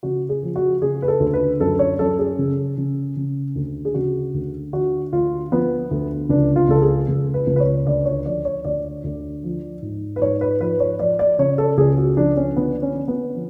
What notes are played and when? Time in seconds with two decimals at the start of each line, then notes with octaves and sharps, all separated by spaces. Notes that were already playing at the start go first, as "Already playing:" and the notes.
0.03 C#3 F#4
0.29 G#4
0.43 F3
0.56 F#4
0.82 C#3 G#4
1.02 B4
1.08 A4
1.20 D2
1.33 B4
1.60 F#2 A4
1.79 C#5
1.99 F#2 A4
2.19 G#4
2.38 C#3
2.78 C#3
3.16 C#3
3.55 D2
3.85 G#4
3.94 C#3 F#4
4.34 D2
4.73 D3 F#4
5.13 D2 F4
5.51 F3 B3
5.91 D2
6.29 C#2 D4
6.56 F4
6.68 C#2 A4
6.82 G#4
7.08 C#2
7.34 B4
7.47 C#2
7.56 B4
7.60 C#5
7.86 D2 D5
8.05 C#5
8.26 F3 D5
8.45 C#5
8.65 D2 D5
9.04 D2
9.43 F3
9.82 G#2
10.16 B4
10.21 G#2 C#5
10.41 B4
10.60 F3 B4
10.80 C#5
10.99 F3 D5
11.19 D5
11.39 C#3 C#5
11.58 A4
11.77 C#2 G#4
11.97 F#4
12.17 F3 D4
12.37 C#4
12.56 D3 B3
12.82 C#4
12.95 D3
13.08 B3
13.35 F3